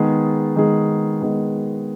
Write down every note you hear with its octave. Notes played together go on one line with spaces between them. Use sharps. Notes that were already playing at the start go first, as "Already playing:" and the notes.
Already playing: D#3 G#3 B3 G#4
D#3 G#3 B3 G#4
D#3 G#3 B3 G#4